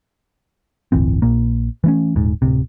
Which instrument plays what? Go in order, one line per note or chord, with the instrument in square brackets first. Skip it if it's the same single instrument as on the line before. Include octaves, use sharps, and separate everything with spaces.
[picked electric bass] D1 G1 E3 C4
A#1 A#2 A#3
E3 A3 C#4
D#1 G#2
D1 G#1 C3